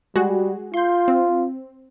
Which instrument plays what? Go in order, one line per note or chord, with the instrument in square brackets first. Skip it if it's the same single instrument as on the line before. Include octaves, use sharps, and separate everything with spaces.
[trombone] G3 [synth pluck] G#3 F#4 G#4
[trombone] F4 [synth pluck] C6 G6
[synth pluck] C4